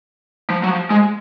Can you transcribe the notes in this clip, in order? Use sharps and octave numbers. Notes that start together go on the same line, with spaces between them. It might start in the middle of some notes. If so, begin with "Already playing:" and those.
F3
F#3
F3
G#3